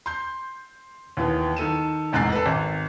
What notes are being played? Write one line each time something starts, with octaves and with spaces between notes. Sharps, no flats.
C6 G6
D#2 E3 B3
D#3 A4 D#7 E7
F1 E2 G#2 F#6 A6 C7
A4 B4
G#1